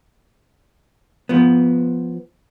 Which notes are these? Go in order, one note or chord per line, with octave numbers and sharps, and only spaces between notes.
F3 B3